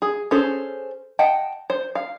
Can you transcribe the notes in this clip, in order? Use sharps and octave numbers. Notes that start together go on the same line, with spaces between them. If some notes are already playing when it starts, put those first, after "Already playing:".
G#4
C#4 G#4 A4 C5
D#5 F#5 G5 A5
C5
F5